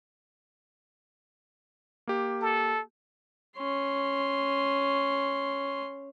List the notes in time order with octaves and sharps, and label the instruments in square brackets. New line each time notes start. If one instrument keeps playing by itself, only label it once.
[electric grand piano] A#3 G4
[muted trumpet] A4
[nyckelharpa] C#4 C6